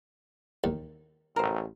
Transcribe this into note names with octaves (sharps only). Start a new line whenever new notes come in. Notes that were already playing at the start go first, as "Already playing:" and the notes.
D#2
A1 A#4 C5